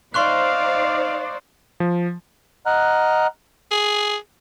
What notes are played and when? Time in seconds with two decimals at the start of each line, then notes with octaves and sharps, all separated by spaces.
0.14 D#4 C5 D5 F5 C6 C#6 F#6
1.80 F3
2.66 D#5 F#5 A#5 F6 F#6
3.71 G#4